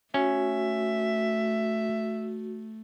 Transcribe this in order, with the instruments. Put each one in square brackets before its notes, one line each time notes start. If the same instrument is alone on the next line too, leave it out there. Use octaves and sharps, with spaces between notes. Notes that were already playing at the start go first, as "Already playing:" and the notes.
[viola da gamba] A3 [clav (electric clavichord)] C#4 [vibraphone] F#4 [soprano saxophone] E5